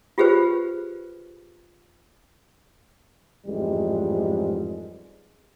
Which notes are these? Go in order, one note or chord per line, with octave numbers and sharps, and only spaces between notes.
F4 G4 G#4 B4 C5
A1 F2 G#2 G3 G#3